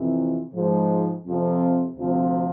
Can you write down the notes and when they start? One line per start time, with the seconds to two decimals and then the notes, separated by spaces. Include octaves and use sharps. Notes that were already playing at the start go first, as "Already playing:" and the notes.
Already playing: F2 C3 E3
0.53 G#2 F3
1.26 F2 C3 F3
1.97 D2 C3 F3